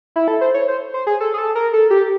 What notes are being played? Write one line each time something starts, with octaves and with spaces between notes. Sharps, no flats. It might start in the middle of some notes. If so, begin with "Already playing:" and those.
E4
A4
C5
C#5
C5
C5
G#4
A4
G#4
A4
A#4
A4
G4